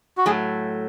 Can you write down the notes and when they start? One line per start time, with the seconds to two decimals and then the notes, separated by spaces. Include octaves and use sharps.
0.17 F#4
0.26 A2 F#3 A3 G#4